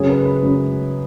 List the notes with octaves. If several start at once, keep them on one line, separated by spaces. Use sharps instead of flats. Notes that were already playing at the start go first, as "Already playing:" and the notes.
Already playing: F#2 C#3 F#3 G#4
B4
B4
F#2 C#3 F#3